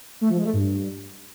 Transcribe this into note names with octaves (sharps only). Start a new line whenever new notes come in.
A3
F3
G#3
A3
G2